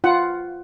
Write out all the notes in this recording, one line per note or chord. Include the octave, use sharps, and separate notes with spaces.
F4 F#5